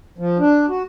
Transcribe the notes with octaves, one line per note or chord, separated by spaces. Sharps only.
F3
D4
F#4